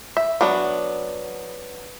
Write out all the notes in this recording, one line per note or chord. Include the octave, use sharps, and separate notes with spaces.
E5
F#3 B3 D4